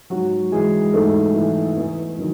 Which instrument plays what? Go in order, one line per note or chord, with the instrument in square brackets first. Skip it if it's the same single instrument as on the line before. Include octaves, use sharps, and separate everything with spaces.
[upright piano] G#2 F#3 F#4
E3 G#3 G#4
G#2 A3 A4
E3
E2
D#3 F#3